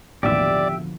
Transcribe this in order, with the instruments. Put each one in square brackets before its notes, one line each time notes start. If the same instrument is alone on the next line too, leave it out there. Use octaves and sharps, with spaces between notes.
[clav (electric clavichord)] A1 D#2 [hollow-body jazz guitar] B2 D3 F3 [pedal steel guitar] G4 E5 [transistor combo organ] D5